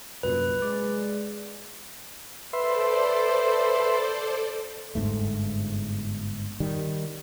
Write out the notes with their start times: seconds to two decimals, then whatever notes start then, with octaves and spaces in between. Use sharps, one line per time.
0.23 C2 F#2 A#2 B4
0.62 G#3 D5
2.53 A4 B4 C5 D5 E5 C6
4.95 G1 F2 G#2 A3
6.60 D#3 G3